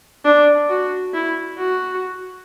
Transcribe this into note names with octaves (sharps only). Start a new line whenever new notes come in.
D4
F#4
E4
F#4